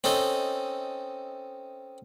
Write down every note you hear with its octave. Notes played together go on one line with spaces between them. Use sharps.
C4 C#4 D#4 A4